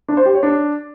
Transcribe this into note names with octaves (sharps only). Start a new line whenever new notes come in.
D4
C5
G4
C#5
D4